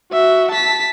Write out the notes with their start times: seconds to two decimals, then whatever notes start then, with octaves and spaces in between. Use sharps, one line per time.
0.12 F#4 E5
0.51 A5 B6